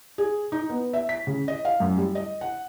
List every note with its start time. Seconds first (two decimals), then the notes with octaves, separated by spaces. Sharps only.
0.18 G#4
0.52 D#4
0.70 B3
0.93 E5
1.09 B6
1.27 C#3
1.48 D#5
1.65 F5
1.80 F#2
1.97 G3
2.15 D#5
2.41 F#5